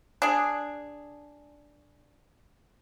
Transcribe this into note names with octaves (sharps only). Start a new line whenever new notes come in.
D4 G#4